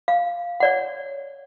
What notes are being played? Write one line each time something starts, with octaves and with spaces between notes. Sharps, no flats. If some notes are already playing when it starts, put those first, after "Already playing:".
F5
C#5 D5 F#5